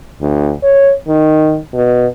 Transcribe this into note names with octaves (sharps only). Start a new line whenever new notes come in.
D2
C#5
D#3
B2